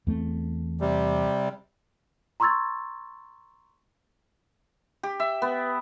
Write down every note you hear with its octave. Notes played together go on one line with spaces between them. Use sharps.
E2 A3 C4
C3 G3
A#5 C6 C#6 E6 G#6 A6
G4
E5
B3